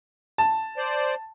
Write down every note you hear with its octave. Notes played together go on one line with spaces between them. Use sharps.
A5
C5 D5